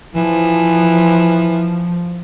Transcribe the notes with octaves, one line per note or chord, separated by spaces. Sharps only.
E3 F3